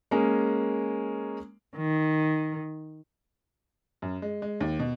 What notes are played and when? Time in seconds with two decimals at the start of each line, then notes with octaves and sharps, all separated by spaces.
0.11 G#3 A#3 C#4
1.76 D#3
4.02 F#2
4.22 G#3
4.42 G#3
4.60 D#2
4.79 B2